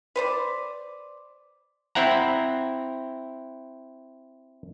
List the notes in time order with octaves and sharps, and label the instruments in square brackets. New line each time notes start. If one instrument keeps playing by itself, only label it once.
[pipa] B4 C5 D5
[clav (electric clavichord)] C4 E4 F#5 A#5